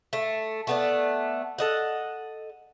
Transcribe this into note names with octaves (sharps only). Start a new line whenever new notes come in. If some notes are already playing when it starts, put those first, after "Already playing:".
A3
A3 B3 D5
A4 D#5 F#5